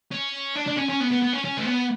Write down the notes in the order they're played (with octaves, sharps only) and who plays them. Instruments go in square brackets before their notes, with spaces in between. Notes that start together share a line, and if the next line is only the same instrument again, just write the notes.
[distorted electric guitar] C#4
D4
D4
C#4
C#4
B3
B3
B3
C#4
C#4
A3
B3